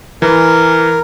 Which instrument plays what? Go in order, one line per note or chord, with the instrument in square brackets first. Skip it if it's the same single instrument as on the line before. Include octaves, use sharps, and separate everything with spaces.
[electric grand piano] E3 [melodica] A#4